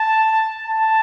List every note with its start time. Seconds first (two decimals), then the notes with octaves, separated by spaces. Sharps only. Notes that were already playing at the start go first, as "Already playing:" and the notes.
Already playing: A5
0.67 A5